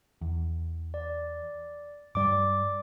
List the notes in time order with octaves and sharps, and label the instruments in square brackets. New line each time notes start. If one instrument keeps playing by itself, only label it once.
[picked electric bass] E2
[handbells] D5
[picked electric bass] G2 G3 [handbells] D5 D6